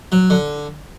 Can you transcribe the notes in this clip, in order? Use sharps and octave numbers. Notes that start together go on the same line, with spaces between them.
F#3
D3